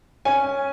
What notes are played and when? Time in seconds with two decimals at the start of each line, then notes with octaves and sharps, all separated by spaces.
0.25 C#4 G#5